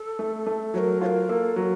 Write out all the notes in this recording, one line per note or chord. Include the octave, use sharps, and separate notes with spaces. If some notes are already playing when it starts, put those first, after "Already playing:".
Already playing: A4
A3
A3
F#3 A#4 C#5
F4 A#4 C#5
A#3 A4
F#3 A#4